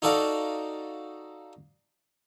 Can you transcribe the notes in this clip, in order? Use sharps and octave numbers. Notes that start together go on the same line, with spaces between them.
D#4 F#4 A4 D5 F5